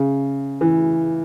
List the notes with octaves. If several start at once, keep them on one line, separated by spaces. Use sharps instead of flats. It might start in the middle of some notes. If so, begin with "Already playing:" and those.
Already playing: C#3
E3